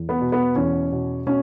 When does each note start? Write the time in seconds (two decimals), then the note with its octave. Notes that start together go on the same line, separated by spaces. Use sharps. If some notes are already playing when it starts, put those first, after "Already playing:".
Already playing: E2
0.09 B3
0.20 B2
0.32 B3
0.56 E2 C#4
0.92 B2
1.26 B2 C#4